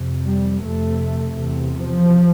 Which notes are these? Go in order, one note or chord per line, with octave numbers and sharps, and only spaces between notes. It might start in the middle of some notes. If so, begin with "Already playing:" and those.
Already playing: F2 C3
G3
F2 C3 A3
E2 C3
F3